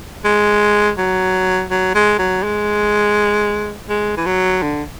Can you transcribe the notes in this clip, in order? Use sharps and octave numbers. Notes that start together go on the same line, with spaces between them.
G#3
F#3
F#3
G#3
F#3
G#3
G#3
E3
F#3
D3